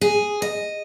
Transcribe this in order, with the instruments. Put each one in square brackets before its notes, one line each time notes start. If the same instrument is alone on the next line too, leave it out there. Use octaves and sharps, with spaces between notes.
[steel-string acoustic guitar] G#4
D#5